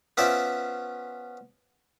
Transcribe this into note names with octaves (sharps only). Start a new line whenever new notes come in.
B3 C#4 F4 C5 D5 E5